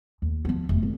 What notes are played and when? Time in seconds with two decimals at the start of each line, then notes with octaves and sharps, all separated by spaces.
0.22 D#2
0.45 F3 B3
0.69 F1
0.83 G#1